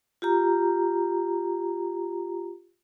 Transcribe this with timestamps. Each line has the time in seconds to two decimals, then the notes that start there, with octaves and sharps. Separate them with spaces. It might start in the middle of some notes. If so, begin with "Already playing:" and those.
0.22 F4 G4 A#5